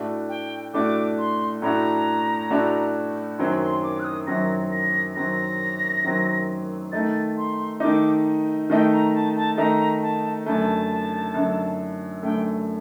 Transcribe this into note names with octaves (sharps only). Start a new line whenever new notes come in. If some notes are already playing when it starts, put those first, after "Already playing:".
Already playing: A2 A3 D4 F#4
G5
A2 A3 D4 F#4 D6
C6
A2 A3 D4 F#4 A#5
A2 A3 D4 F#4
F#2 D#3 F#3 C4 C6
C6
D6
F#6
D#6
F#2 D#3 F#3 C4 A#6
A#6
F#2 D#3 F#3 C4 A#6
F#2 D#3 F#3 C4
D#3 A3 D#4 A6
C6
D#3 A3 D#4 D6
D#3 A3 D#4 G5
A#5
A5
A5
D#3 A3 D#4 A#5
A5
F#2 D3 A3 A5
F#2 D3 A3
F#2 D3 A3 G5